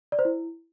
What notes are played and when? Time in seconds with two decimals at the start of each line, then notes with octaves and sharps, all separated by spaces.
0.12 D5
0.19 C5
0.25 E4